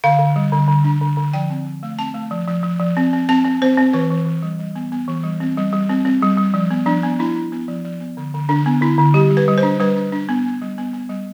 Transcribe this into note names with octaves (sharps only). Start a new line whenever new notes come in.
D3 F5
D3
G3
D3
D3
D4
D3
D3
F3 G5
C4
F3
A3
C4 A5
A3
F3
F3
F3
F3
C4
C4
C4 A5
C4
C4 C5
C4
E3 B4
E3
E3
G3
G3
B3
B3
E3
G3
C4
G3
G3
C4
C4
G3
G3
F3
B3
F3 D4
B3
D4 E4
D4
B3
F3
F3
B3
D3
D3
D3 D4
B3
D3 E4
D3
G3 G4
G3
B4
G3
C5
D4
G3 B4
D4
D4
B3
B3
G3
B3
B3
G3